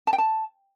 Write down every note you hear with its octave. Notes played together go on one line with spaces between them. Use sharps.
A5
G5
A5